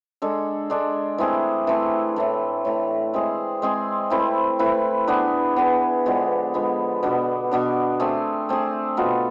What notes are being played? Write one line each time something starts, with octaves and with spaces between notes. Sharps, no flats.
G#3 D4 A4
G#3 D4 A4
E3 A3 C4 G#4
E3 A3 C4 G#4
A2 E3 A3
A2 E3 A3
G#3 C4 G#4
G#3 C4 G#4
A3 C4 E4 B4
A3 C4 E4 B4
B3 D4 G#4 B4
B3 D4 G#4 B4
D3 F3 G#3 B3
D3 F3 G#3 B3
B2 B3 D4
B2 B3 D4
A3 C4 G#4
A3 C4 G#4
B2 B3 F4 A4